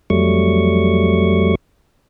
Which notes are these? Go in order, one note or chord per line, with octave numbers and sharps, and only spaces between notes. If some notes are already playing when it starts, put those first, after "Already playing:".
F2 F#3 G3 A3 C#6